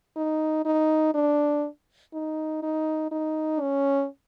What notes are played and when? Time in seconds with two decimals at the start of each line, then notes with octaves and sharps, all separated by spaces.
0.16 D#4
0.65 D#4
1.14 D4
2.14 D#4
2.63 D#4
3.11 D#4
3.61 C#4